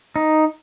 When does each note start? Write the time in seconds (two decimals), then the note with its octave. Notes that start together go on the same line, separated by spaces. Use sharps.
0.16 D#4